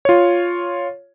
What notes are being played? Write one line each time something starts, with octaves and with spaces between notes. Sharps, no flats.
F4 C#5